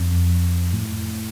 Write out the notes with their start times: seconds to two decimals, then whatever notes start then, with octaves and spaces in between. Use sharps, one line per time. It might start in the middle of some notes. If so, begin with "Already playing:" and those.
Already playing: F2
0.73 A2